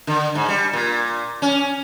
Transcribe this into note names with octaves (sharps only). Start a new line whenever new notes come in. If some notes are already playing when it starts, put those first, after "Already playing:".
D3
G#2
G3
A#2
C#4